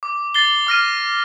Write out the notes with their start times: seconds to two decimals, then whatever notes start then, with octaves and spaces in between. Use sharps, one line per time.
0.03 D6
0.34 A6 C7 G7
0.67 D6 F6 A#6 D#7